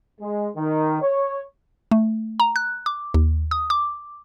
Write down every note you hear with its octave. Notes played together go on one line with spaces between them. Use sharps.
G#3
D#3
C#5
A3
A#5
F#6
D6
D#2
D#6
D6